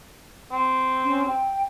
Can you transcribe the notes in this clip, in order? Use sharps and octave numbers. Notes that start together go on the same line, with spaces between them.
C4
C#4
G5